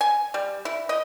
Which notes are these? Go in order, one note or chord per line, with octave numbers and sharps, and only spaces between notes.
G#5
G3
E4
D#5